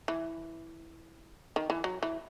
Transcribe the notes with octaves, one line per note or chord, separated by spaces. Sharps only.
E3
D#3
E3
F#3
E3